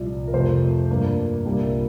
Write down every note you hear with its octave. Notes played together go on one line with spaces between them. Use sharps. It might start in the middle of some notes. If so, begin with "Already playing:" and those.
Already playing: C2 A#2 F3 D5
A#4
F2 C3 F3 A3 C4 C5
G2 F3 A#3 D4
C2 A#2 G3 A#3 D4 A#4